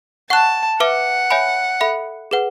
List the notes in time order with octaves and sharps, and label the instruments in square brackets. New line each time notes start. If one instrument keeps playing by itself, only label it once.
[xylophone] F#5 C#6 F#6 [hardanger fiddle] A5
[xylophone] B4 E5 A5 D6 [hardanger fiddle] F#5
[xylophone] C#5 E5 G#5 B5
A4 E5 B5
G#4 B4 F#5